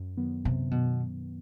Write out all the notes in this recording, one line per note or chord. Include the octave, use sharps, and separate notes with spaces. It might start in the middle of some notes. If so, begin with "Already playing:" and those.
Already playing: F#2
D#3 F#3 B3
F#2 C3
B2 D#3 F#3 B3